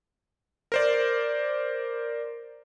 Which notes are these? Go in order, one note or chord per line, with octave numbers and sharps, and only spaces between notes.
A#4 C5 D5